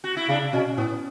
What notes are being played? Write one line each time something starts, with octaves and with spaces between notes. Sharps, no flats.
F#4
E4
C#3 D4
B2 C#4
A2 B3